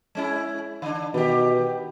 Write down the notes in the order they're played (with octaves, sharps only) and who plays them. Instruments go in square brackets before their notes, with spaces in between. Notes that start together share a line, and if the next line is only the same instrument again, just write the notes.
[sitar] G#3 C#4 E4
D3 D4
[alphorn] B2 [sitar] D#3 G4